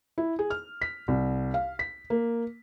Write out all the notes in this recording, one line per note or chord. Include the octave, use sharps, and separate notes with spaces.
E4
G#4
F6
B6
C2
F5
B6
A#3